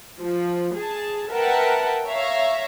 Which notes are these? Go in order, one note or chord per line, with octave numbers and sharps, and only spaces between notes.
F3
G#4 A5
A#4 B4 E5 F#5 G5 A5
C#5 E5 F5 A#5